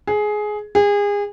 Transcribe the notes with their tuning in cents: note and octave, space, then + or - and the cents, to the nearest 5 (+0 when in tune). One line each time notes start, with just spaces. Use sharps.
G#4 +15
G#4 -30